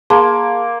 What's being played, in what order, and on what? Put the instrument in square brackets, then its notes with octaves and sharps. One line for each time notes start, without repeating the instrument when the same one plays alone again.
[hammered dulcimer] A#3 [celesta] G#4 A5 [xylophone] C6